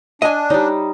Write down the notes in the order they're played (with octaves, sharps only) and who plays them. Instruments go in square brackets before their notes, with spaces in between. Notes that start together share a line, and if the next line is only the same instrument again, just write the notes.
[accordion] D4 [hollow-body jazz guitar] D#5 G#5
[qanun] G3 D#4 [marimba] C#5 D5